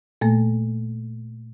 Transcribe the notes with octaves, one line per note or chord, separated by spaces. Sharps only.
A#2 A3 A#3